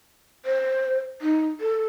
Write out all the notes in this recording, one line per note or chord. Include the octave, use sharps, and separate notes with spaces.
C5
D#4
A4